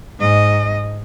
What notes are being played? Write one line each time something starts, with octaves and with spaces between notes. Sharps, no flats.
G#2 D#5